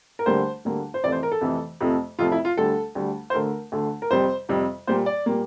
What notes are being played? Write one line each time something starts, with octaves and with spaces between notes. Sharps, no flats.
A#4
D2 D3 G3 A#3 C5
D2 D3 G3 A#3
C5
F2 C3 E3 A3 D5
C5
A#4
A4
F2 C3 E3 A3
F2 C3 F3 A3
F2 C3 F3 A3 F4
E4
F4
D2 D3 G3 A4
D2 D3 G3
C5
D2 D3 A3 A#4
D2 D3 A3
A#4
F2 C3 G3 C5
F2 C3 G3
A#2 G3 A#3 C5
D5
A#2 G3 A#3